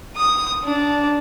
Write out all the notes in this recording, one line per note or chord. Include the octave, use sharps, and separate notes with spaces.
D#6
D4